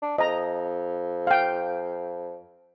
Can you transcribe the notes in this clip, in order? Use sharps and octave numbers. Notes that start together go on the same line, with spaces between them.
D4
F2 D#5 A#5
F5 G5